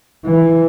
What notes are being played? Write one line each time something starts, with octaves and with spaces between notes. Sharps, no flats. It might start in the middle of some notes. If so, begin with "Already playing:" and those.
E3